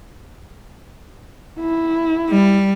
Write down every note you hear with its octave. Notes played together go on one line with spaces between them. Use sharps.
E4
G3